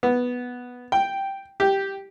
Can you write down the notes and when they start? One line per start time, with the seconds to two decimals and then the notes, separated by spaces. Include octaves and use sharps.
0.03 B3
0.92 G5
1.60 G4